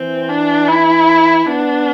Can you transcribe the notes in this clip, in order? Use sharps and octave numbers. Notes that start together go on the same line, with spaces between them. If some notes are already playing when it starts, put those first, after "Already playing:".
Already playing: E3 C4
D4
E4
B3 D4